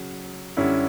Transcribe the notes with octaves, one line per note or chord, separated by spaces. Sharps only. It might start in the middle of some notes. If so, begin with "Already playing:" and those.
Already playing: C#3 F#3
F#2 D3 G3 C#4 E4